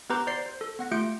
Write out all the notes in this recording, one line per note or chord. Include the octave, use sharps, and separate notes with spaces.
B3 G4 B4 A#5 D6 G6
C5 D5 C7
C5
A4
B3 F#5 A#6
A3 F4 G4 G6 C#7 D7